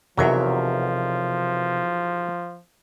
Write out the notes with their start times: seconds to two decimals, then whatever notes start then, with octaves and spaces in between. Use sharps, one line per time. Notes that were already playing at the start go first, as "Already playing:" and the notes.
0.18 B1 E2 C3 F3 F#3 A#4 E5